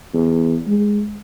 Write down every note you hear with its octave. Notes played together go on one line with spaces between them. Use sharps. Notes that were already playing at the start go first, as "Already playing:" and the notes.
E2
G#3